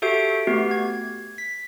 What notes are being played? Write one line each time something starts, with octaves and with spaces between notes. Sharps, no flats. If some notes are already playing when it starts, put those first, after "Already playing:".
F#4 G4 A4 E5 G6 D7
A3 B3 F#4 G4
G#6
B6